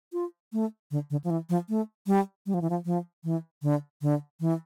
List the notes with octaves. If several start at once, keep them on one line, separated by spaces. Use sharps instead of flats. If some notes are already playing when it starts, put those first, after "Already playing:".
F4
A3
D3
D3
F3
E3
F3
A3
G3
G3
F3
E3
F3
F3
E3
D3
D3
E3